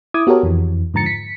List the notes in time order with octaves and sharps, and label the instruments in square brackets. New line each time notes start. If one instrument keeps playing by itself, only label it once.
[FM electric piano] E4 D6 D#6 G#6
B3 F#4 G4 A4 A#4 C#5
F2 E3
G#2 D3 F3 A#5 A6 C#7
B6 C#7